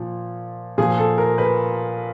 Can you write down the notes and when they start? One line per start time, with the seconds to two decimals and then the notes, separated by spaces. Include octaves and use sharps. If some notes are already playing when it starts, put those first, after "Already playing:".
Already playing: A#2 F3
0.78 A#2 F3 G#4
0.98 A4
1.18 A#4
1.38 B4